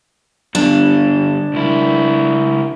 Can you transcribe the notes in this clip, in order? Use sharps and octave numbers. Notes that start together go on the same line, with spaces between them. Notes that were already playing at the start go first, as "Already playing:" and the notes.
G2 D3 D4
C#2 E4